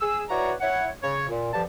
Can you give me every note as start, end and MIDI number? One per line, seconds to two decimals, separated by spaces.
0.01 0.22 68
0.01 0.22 88
0.30 0.53 64
0.30 0.53 66
0.30 0.53 71
0.30 0.53 73
0.30 0.53 74
0.30 0.53 82
0.61 0.88 64
0.61 0.88 73
0.61 0.88 78
1.02 1.27 49
1.02 1.27 73
1.29 1.53 46
1.54 1.62 43
1.54 1.62 50
1.54 1.62 53
1.54 1.62 67
1.54 1.62 81